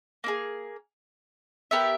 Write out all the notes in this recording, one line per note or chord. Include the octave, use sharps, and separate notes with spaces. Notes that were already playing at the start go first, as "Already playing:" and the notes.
A#3 E4 G#4
B3 G4 A#4 E5